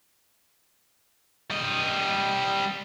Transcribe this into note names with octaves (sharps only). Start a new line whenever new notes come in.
G3 D#5